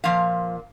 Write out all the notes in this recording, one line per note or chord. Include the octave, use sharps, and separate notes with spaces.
A#2 F3 F5